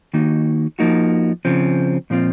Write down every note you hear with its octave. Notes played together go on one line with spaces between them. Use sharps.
D#3 A#3 D#4 F#4
F3 A#3 D#4 F#4
C#3 F3 C4
A#2 F3 C4 F4